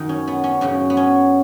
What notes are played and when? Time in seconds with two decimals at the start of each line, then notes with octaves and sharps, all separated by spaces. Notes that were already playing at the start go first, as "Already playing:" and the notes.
Already playing: F#2 D#3 D#4
0.09 C#4
0.27 B3
0.44 C#4
0.61 F#2 C#3 C#4
0.90 B3
0.97 C#4